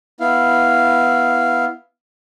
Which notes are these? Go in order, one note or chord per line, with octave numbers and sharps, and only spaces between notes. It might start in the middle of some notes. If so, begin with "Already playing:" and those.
B3 E4 F5